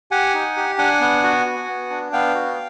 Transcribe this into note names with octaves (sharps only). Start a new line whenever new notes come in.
G4 F#5 G#5
D#4
G4
D4 F#5 G#5
B3
F#4
F#4
B3
D4
B3 F5 G5
F#4